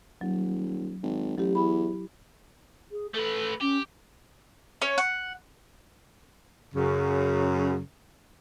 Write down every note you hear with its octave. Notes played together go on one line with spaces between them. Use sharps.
D#1 F#3
G#1
A1 F#3 G4
E2 E4 B5
G#4
A3 A4 B4
C#4 G4
C#4 C#5
F#5
F#2 C#3